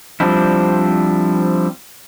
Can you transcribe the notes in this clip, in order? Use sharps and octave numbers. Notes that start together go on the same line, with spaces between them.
F3 G3 C4 D4 E4